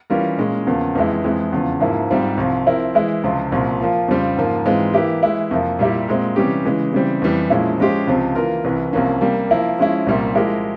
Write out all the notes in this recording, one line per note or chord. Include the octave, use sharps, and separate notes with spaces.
E3 G3 C#4 F4 A#4
A#2 G#3 C#4
E2 C#3 F3 A#3
F2 E3 G#3 E4
F2 E3 G#3
E2 C#3 F3
G#2 F3 A#3 E4
G#2 G3 C4 F4
C2 C3 F3
F3 C4 E4 A#4
E3 G#3 E4
C#2 C3 F3 C4 F4
C2 A#2 F3
F3 A#3 F4
F2 C#3 G3 C4 F4
G#2 F3 A#3 F4
G#2 E3 G#3 C4 F4
E3 A#3 E4 G4
E3 G#3 E4
F2 C3 F3 A#3
A#2 G3 A#3 E4 G4
A#2 G#3 C4
C3 E3 G3 C#4 G4
C#3 E3 G#3
C#3 E3 G3 C4
F2 E3 G3
A#2 F3 G#3 C#4 E4
F3 G#3 C#4 G4 C5
C#2 C3 F3 C4
E3 A#3 F4 A#4
C2 C3 E3
C2 C3 F3 A#3 C#4
C3 G3 A#3
F3 A#3 E4 A#4
F3 G#3 C#4 E4
C2 A#2 G3 A#3
F3 G#3 E4 G4 A#4